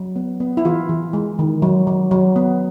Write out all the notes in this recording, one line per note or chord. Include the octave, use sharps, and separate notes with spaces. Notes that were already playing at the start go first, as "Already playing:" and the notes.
Already playing: F#3
B3
B3
E4
E3 F4
E3
G#3
D#3
F#3
F#3
F#3
B3